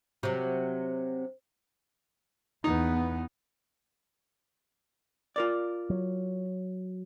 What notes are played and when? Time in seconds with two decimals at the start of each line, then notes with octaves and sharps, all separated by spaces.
0.23 C3 F#3
2.64 E2 B3 D#4
5.36 F4 A#4 D5
5.90 F#3